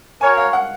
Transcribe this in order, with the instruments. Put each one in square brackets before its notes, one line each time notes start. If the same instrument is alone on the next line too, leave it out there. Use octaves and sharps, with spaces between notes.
[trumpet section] F#4 A#4 C#5 [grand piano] G#5
[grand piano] F5
F#5